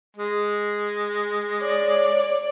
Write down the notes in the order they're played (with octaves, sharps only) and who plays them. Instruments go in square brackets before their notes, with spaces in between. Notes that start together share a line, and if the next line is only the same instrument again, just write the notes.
[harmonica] G#3
[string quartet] C#5 D5